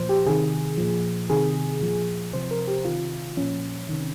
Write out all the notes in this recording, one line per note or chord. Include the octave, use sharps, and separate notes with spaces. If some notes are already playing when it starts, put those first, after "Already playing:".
Already playing: A#2 F3 C5
G4
C3 D#3 G#4
A#2 F3
C3 D#3 G#4
A#2 F3
C3 F3 C5
A#4
G4
C3 D#3 F4
A#2 F3 C#4
C3 D#3